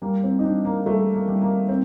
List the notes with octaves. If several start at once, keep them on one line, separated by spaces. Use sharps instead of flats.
G3 A#3
C4
D#4
G3 D4
A#3
G3 A3
A#3
G3
A#3
C4